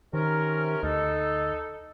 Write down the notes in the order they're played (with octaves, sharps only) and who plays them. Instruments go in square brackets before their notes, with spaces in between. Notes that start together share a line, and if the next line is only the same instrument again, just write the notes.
[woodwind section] C3 C#4 A#4 [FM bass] D#3
[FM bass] D2 [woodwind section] D#4 A4